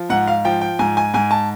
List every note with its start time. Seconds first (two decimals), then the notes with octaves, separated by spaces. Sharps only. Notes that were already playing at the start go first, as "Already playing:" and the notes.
Already playing: F3
0.09 G#2 F#5
0.27 F5
0.45 F3 G5
0.61 G5
0.79 G#2 G#5
0.97 G#5
1.14 G#2 G#5
1.31 A5